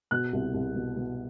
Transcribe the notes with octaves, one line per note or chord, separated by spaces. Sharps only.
B2 F#6
C2
C2
B2
B2